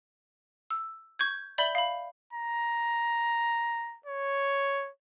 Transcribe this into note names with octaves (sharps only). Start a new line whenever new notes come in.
E6
C#6 G6 G#6
D5 E5 B5 G6 F#7 G7
F5 B5
A#5
C#5